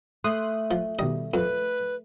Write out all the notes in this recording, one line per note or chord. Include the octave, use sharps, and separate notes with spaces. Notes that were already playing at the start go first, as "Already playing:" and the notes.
A3 C6 D#6 F#6
F3
B2 D#3 G3 D#5
F2 B4